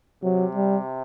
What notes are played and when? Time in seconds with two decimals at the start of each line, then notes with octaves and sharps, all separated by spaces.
0.23 C3 F#3
0.55 G3